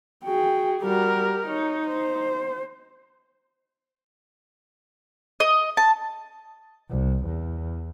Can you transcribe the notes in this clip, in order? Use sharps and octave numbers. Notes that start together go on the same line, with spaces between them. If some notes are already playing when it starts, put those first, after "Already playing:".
F#4 G#4 G5
G3 F#4 G4 A#4
D#4 C#5
C5
D#5
A5
C2
E2